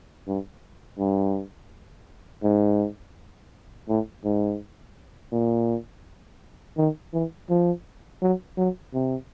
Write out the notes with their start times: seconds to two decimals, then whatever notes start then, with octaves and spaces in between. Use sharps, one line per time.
0.27 G2
0.99 G2
2.43 G#2
3.89 A2
4.24 G#2
5.32 A#2
6.77 D#3
7.13 E3
7.50 F3
8.22 F#3
8.58 F#3
8.94 C3